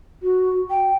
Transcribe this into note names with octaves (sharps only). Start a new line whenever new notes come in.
F#4
G5